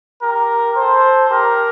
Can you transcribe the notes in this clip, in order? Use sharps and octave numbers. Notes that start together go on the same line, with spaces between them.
G4 A#4
A4 C5
G4 A#4